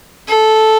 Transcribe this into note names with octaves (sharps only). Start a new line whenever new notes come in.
A4